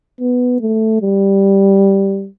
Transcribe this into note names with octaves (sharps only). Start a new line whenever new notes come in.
B3
A3
G3